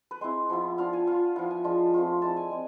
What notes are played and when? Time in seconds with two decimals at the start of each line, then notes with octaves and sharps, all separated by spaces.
0.11 B4
0.21 G#3 C4 E4 C5
0.50 F3 B3 E4
0.78 B3 D4 F4 F5
0.93 G#5
1.07 B3 F4 F5
1.36 F3 B3 E4 F5
1.51 G#5
1.64 F3 G#3 D4 F4
1.94 A3 C4 F4
2.22 G#3 C4 E4 A5
2.37 G#5
2.51 G#3 C4